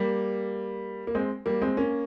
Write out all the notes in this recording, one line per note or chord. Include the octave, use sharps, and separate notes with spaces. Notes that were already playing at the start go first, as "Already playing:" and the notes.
Already playing: G3 A#3
A#3
G#3 C4
G3 A#3
G#3 C4
A#3 C#4